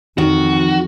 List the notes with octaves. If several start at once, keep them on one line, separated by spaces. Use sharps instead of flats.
F2 D#3 F#4